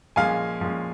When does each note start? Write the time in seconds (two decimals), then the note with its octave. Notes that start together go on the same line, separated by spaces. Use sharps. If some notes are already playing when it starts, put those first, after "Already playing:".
0.16 A#2 F3 G#3 C#4 F5 G#5
0.61 A#2 F3 G#3 C#4